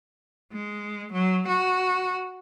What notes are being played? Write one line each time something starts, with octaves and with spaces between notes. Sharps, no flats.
G#3
F#3
F#4